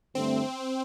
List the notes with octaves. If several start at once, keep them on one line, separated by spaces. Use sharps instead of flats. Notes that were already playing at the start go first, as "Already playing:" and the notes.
G2 D3 A3 C4